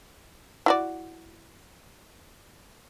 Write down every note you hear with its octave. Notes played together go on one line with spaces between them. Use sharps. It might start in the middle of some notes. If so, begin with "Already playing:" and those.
E4 F#4 D5